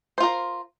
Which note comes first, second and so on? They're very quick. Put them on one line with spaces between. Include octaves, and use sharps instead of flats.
C5 F4 A#4